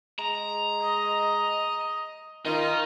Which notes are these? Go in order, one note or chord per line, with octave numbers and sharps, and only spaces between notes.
G#3 A#5
D#5
D#3 D#4 F4